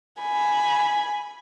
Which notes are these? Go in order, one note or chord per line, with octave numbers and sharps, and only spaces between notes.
G#5 B5